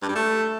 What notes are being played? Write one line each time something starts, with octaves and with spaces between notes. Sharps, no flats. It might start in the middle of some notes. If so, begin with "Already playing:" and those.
G2
G3
A3